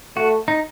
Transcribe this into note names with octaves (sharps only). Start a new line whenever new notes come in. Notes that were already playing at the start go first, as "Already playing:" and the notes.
A3 F#4
D#4